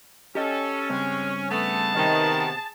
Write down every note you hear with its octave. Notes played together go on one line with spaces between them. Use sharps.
C#4 G4 A4 D#5 G5
G2 C#3 G#3 C4
A3 B3 G#4 A5
C3 D#3 B3